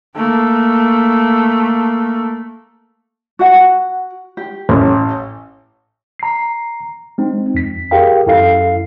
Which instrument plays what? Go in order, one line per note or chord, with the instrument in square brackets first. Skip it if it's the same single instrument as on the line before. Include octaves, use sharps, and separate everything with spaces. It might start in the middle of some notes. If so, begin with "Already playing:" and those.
[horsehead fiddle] A3 A#3
[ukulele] F#4 F#5
G4
[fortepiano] A1
[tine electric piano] A#5 C7
G#3 C4 D#4
F2 B6
G4 G#4 A#4 F5 G5
F#2 E4 A4 F5 C7